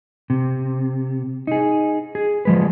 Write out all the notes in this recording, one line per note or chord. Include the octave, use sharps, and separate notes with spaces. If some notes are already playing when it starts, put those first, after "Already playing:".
C3
D#4 G#4
G#4
F3 G#3 B4